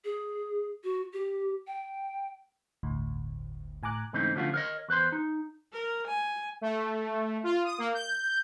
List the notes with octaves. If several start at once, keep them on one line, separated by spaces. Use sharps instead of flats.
G#4
F#4
G4
G5
G1 D2 A2
A2 G#5 A#5 D6 F#6
G#2 C#3 E3 A3 C4 D#4
D3 F3 A3 C#4 F4 F#4
A#4 B4 C#5 D#5
E2 B4 C5 C6
D#4
A#4
G#5
A3
F4
D#6
A#3
G6